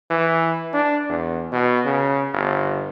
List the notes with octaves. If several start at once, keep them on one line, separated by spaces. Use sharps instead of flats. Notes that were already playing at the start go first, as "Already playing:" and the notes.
E3
D4
E2
B2
C#3
G1